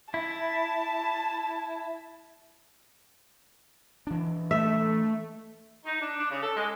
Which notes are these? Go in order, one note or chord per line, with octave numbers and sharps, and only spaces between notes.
E4 A5
E3 D4
A3 E5
D#4
D4
D4
C#3
A4
G#3